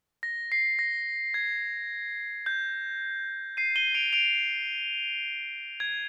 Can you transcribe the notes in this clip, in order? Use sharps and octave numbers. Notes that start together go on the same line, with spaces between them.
A#6
C7
A#6
G#6
G6
C7 D#7
D#7 G7
D7 F7
D7 F7
G#6